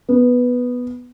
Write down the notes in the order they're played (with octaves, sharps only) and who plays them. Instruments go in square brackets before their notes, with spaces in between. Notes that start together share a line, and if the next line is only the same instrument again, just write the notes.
[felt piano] B3